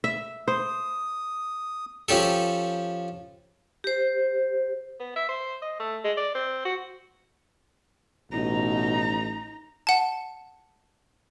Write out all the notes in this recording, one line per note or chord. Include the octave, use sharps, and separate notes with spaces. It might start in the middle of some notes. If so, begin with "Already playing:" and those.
E5
C5 D#6
F3 C#4 G4 A4
G4 C5
B3
E5
C5
D#5
A3
G#3
D5
C4
F#4
A1 B2 D#4 A#5
F#5 A5